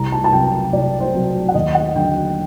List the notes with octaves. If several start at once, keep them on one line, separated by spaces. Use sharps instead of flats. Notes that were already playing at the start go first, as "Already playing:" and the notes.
Already playing: C2 A#5
A5
A5
C3 F#3 G5
C2 D5
C5
C3 F#3
F#5
D#2 D#5
F#5
D3 F#3 G5